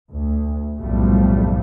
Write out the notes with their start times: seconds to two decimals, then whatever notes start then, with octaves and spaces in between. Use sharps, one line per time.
0.11 D2
0.79 F#1 B1 A2 F3 G3 A3